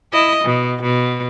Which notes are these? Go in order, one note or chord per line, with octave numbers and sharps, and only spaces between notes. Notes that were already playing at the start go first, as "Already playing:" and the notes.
E4 D#5
B2
B2